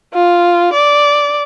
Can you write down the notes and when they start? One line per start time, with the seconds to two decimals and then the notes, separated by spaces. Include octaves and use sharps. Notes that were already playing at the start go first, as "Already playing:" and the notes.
0.13 F4
0.73 D5